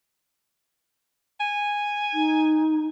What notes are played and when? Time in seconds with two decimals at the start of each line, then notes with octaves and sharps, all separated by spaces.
1.40 G#5
2.13 D#4